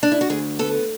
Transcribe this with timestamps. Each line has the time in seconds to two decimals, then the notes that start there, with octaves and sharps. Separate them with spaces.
0.03 D4
0.12 E4
0.21 F#4
0.30 D2 G#4
0.59 B3 A4